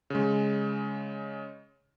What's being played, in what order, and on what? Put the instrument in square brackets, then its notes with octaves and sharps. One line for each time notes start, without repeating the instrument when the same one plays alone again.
[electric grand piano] C#3 G#3